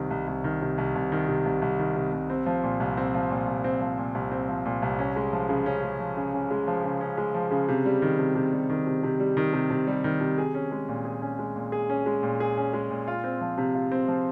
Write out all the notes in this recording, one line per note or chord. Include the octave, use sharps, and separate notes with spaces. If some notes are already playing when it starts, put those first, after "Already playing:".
Already playing: C2 C3 D#3
C2
C2
D#3
C3
C2
C2
D#3
C3
C2
C2
D#3
C3
C2
C4
F3
A#2
C2
C4
F3
A#2
C2
C4
F3
A#2
C2
C4
F3
A#2
C2
C#4
G#3
F3
C#3
C#4
G#3
F3
C#3
C#4
G#3
F3
C#3
C#4
G#3
F3
C#3
C3
G3
D#3
C3
C3
G3
D#3
C3
C3
G3
D#3
C3
C3
G3
D#3
C3
G#4
C#4
G#3
A#2
G#4
C#4
G#3
A#2
G#4
C#4
G#3
A#2
G#4
C#4
G#3
A#2
F4
C4
F3
C3
F4
C4
F3